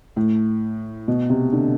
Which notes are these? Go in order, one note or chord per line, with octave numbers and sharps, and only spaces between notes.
A2
B2
C3
D3